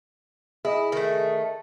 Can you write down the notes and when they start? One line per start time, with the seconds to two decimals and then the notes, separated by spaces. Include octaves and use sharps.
0.65 E4 G#4 D#5 D#6
0.92 D#3 A3